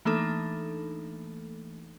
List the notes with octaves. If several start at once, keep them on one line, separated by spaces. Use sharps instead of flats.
E3 A3 A#3 D4 D#4 A4